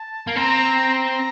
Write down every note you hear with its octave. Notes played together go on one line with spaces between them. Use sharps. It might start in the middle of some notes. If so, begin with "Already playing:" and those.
Already playing: A5
A#3
C4 A#5
A#5